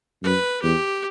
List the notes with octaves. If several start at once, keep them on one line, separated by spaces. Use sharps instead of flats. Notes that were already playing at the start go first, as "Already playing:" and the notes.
F#2 B4
E2 G4